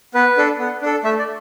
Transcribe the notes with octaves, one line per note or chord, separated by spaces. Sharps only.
B3 B4
D4 A4
B3
D4 A4
A3 E5
D5